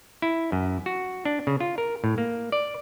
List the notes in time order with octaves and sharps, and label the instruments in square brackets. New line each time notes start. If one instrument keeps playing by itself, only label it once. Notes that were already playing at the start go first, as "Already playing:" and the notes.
[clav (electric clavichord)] E4
F#2
F#4
D4
C#3
F4
A#4
A2
A#3
D5